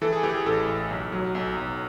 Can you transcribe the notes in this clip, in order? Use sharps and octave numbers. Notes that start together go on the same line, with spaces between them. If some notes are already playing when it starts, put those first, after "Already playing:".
E3 A4
G#4
E3 G4
G#4
A1 A4
A1
B1
F#3
B1
B1